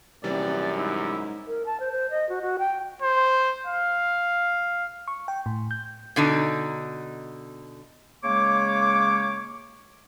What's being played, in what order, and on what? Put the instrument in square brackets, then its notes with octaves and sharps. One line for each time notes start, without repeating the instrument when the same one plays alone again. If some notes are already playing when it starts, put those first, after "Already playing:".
[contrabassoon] D#1 [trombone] F#2 [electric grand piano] C3 E3 G3 [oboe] D5
[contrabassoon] G#2 [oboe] E4
[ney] A#4
A5
C5
C5
D#5
F#4
F#4
G5
[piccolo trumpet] C5
F5
[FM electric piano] C#6
G5
A2
G6
[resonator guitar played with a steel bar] B2 D3 D#4
[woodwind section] C#3 G#3 A#3 C#5 D6